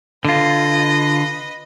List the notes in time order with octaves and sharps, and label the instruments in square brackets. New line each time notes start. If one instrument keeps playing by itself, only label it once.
[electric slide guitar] D3 F4 [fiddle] B4 D#5